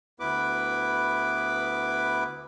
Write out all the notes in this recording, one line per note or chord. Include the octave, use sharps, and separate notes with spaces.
D2 B3 E4 B4 D6